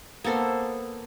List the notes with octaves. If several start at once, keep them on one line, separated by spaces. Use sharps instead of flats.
A#3 B3 A4 C5